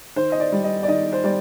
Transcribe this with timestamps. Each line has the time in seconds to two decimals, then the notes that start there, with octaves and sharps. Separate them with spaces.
0.16 D#3 C5
0.32 D#5
0.40 D5
0.52 G3
0.64 D#5
0.83 D5
0.88 D#3 D#5
1.13 C5
1.24 G3 D5